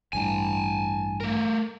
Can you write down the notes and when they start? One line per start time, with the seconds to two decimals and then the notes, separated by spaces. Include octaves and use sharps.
0.13 A1 G2 E3 G#5 A5
1.20 A3 A#4